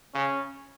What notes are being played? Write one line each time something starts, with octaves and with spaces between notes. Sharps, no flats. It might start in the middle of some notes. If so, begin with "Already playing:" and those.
C#3 C#4